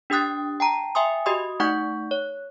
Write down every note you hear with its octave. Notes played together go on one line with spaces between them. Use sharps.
D4 G4 G5 D#6 F#6 A6
G5 A5 A#5
E5 G5 G#5 C6 D#6
F#4 G4 D#5 C6 D#6
A3 D#4 F#5 C#6 G6
C#5